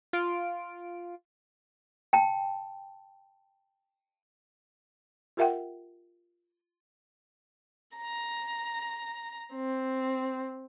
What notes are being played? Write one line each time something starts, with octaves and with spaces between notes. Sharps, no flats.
F4 D7
G5 A5
F4 G4 A#4 E5 F#5 G5
A#5
C4